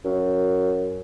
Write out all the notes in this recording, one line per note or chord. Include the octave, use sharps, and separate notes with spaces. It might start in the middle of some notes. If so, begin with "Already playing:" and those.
F#2